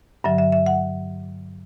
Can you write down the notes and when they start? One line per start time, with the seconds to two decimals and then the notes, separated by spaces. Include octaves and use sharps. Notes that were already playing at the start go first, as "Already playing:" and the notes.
0.24 G2 D3 F#3 E5
0.38 E5
0.52 E5
0.66 F#5